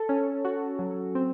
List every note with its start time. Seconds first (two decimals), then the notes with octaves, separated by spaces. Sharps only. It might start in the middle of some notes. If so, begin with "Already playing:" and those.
Already playing: A4
0.09 C#4
0.45 F#4
0.79 F#3
1.15 C4